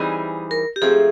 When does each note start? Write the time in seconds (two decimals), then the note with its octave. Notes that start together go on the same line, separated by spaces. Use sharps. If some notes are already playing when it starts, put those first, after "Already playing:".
Already playing: E3 G3 C4 D#4 G#4
0.51 A#4
0.76 G4
0.82 G#2 F3 A3 C4 G#4